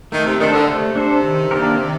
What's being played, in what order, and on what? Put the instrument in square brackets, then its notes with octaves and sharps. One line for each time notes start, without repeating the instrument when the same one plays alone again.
[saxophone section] D#3 [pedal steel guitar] A3
[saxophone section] C3
[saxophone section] D#3 [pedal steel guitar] D4 A4 C5
[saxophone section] D3
[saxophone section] C3 [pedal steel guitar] A3
[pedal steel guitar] D4 A4 C5
D#3
A#3 D4 G4 A#4
D#3